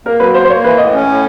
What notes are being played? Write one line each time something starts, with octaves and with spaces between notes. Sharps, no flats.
A#3 A#4
F#3 B4
A#3 C5
C5
A#3 C#5
E3 B4
A2 D#5
C#4
A2